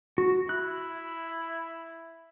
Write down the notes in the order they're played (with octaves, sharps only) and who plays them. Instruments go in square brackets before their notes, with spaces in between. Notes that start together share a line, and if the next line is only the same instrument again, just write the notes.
[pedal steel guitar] F#4
[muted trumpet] E4 [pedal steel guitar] F#6